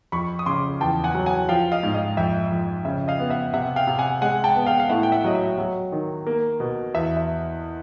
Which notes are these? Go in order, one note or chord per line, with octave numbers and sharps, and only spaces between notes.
F2 B5 C#6
D#6
C#3 C6 D6
E2 G5 A5
F#5 G#5
F#3
F#5 G#5
F3 F5 G5
D#5 F5
G#2
D#5 F5
F2 E5
F2
C#3 E5
D#5 F5
B3
E5 F#5
C3 E5 F#5
F5 G5
C3
F#5 G#5
G#3 F#5 G#5
G5 A5
B3
F5 G5
F5
A2 E5 F#5
G5
E5 F#5
F#3 D#5
E5
F#3
D#3
A#3
B2
E2 E5
E5